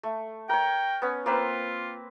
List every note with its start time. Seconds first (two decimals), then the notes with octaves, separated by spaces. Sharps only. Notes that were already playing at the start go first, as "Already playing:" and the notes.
0.03 A3
0.49 A#4 C#5 G5
1.02 B3 C#4
1.26 A#3 C4 F4 B4